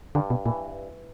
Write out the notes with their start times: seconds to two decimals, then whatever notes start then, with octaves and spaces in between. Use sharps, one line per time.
0.15 G2 D3
0.30 B2
0.46 A#2 E3